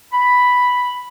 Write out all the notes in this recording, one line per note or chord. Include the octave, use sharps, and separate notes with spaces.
B5